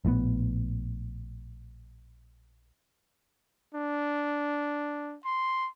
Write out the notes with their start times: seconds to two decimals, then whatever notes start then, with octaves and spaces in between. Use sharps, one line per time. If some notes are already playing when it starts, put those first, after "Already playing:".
0.05 A#1 A2 D3 B3
3.75 D4
5.25 C6